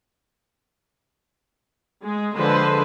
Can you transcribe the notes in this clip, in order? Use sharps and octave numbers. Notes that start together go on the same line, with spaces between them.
G#3
D3 F3 G#3 B4 C5